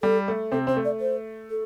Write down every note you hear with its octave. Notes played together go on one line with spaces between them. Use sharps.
G3 A4
A3
C3 C4 A4
C4 C5
A3
D5
C5
A4